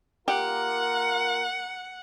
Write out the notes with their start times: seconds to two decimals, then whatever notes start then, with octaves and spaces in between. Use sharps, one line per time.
0.28 A#3 F4 G4 A#4 F#5